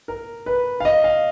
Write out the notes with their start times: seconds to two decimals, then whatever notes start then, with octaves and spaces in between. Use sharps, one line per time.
0.08 A#4
0.46 B4
0.80 F5
0.85 D#5
1.04 F5